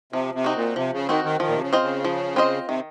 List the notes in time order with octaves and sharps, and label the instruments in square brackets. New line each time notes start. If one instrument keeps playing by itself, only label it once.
[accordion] C3 [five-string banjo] F3
[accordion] C3
[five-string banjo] C4 D#4 F#4
[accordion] A#2
[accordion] C3 [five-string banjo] F3
[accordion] C#3
[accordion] D#3 [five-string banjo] C4 D#4 F#4
[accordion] D#3
[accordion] D#3 [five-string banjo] F3
[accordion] A#2
C3
C#3
[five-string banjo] C4 F4 C5 D#5
[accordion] C#3
[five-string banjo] F3
C4 F4 C5 D#5
[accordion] C3 [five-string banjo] D#3